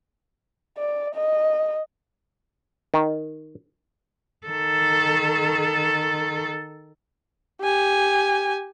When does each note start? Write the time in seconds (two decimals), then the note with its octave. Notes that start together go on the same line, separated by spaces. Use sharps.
0.78 D5
1.15 D#5
2.94 D#3
4.46 D#3 A4
7.62 G4 G#5